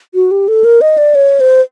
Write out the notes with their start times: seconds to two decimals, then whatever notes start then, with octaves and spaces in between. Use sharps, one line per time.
0.15 F#4
0.31 G4
0.48 A4
0.64 A#4
0.81 D#5
0.98 D5
1.15 C#5
1.40 C5